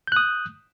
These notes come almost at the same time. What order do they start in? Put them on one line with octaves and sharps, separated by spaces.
G6 F#6 D#6